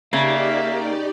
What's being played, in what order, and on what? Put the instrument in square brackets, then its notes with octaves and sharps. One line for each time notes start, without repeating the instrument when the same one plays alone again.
[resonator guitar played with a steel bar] C#3 [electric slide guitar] A#3 [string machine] D#4 G4 D5 [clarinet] E5